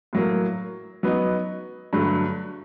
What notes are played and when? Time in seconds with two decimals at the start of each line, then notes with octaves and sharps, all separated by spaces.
0.13 A2 F#3 A#3
1.03 F#3 B3 D#4
1.93 G2 D3 F#3 A3